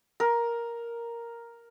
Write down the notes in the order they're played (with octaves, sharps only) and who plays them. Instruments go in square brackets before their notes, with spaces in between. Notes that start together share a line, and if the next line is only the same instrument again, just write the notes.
[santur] A#4